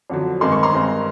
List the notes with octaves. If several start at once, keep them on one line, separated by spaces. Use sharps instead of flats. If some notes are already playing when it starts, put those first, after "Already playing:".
F2 D3 F#3
G2 D#3 G#3 C4 C6
C#6
A#5 C6
G2 D#3 G#3 C4